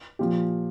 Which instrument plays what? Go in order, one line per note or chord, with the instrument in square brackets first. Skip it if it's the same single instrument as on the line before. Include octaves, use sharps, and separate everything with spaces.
[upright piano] A#2 F3 G4